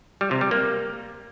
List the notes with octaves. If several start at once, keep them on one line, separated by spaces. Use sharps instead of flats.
G3
C3
G3
A#3